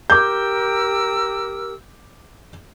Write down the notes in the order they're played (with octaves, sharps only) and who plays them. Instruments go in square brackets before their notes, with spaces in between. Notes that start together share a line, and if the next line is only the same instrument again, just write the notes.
[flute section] G4 A#4 E6 [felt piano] D6 G6